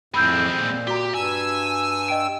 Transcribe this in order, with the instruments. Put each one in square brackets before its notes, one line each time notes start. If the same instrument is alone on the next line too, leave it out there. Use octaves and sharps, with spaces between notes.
[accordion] F2 A2 [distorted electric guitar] G#3 C4 [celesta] B5 E6 G6
[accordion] A#2
[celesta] F#4 A#5 [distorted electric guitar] G4
[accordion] G2 E6 [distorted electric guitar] G#5
[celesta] D#5 G5 D7